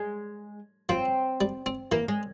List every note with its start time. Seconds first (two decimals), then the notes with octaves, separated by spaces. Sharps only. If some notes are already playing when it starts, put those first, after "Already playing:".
Already playing: G#3
0.89 F3 C4
1.41 G3
1.66 C4
1.92 E3 A#3
2.08 G#3